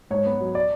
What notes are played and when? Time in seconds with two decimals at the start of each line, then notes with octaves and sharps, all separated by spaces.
0.11 G#2 C#5
0.26 B3
0.40 F#3
0.55 D5